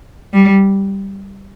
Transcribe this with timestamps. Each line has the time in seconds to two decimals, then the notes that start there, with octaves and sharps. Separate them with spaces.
0.33 G3